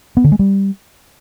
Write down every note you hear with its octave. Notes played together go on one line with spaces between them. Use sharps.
B3
D3
G#3
G3